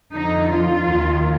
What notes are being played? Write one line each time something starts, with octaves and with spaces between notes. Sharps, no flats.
F2 D3 F3 D#4
F4
D#2 D#3